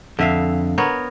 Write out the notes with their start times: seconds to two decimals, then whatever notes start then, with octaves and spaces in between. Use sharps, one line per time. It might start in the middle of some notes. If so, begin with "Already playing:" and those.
0.19 F2 D3 E5 F5
0.78 B3 A#4 C#5